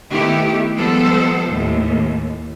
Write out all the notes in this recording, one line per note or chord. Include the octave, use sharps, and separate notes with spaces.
D#3 A3 B3 E4 G4
F3 G3 G#3 B3 A4 C5
D#2 A2